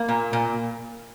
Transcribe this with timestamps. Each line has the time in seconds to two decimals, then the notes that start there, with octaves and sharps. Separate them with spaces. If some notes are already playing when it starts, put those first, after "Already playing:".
Already playing: A#3
0.09 A#2
0.33 A#2